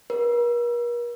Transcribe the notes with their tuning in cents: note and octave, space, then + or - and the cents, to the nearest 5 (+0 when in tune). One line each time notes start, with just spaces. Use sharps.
A#4 +45